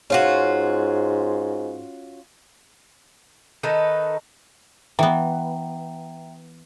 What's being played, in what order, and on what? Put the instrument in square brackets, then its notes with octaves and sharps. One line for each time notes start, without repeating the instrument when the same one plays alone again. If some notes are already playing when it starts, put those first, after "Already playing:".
[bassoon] G#2 [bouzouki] C#4 F4 F#4
[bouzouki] D#3 D#4 A4 B4
[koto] E3 B3 [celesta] E5 G5 A#5